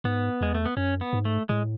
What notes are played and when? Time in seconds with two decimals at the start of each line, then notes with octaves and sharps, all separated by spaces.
0.04 G#2 B3
0.41 E2 G#3
0.55 A3
0.66 B3
0.77 F#2 C#4
1.01 B3
1.13 G#2
1.25 A3
1.49 A2 G#3